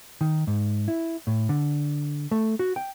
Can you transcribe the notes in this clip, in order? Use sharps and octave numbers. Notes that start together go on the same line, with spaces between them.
D#3
G#2
E4
A2
D3
A3
F#4
G5